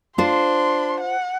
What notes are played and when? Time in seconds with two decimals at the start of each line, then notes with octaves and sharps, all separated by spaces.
0.18 D4 F4 C5 C6
1.00 F#5